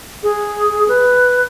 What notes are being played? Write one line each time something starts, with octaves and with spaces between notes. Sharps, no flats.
G#4
B4